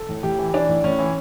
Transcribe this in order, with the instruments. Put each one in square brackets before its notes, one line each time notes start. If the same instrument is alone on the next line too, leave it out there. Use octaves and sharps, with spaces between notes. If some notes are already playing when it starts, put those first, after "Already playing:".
Already playing: [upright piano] A4
A2
A2 G4
E3
E3 D4
A2
A2 C#4
E3